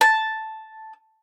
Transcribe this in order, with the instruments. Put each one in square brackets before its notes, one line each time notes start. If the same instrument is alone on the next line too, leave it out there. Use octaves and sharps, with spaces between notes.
[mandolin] A5